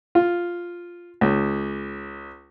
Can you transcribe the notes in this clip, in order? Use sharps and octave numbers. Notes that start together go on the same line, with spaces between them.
F4
C#2